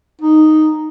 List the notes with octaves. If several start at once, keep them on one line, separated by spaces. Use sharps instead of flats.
D#4